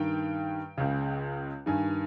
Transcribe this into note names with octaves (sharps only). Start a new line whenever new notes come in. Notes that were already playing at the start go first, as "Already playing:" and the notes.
Already playing: G2 D#3 G5
C#2 C#3
G2 D#3 G#5